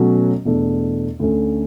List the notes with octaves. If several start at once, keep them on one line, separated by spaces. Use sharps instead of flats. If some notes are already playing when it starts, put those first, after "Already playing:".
Already playing: B2 F#3 A3 C#4 F#4
E2 B2 A3 D4
D2 D3 A3 C#4